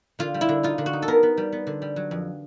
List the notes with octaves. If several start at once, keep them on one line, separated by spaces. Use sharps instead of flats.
D3 F4
G3
E4
D3
D#4 F4
D3
F#4
D#4
A4
B3 A#4
B3
G3
B3
D3
G3
F#3
F2